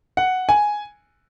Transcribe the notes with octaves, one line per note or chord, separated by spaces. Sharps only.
F#5
G#5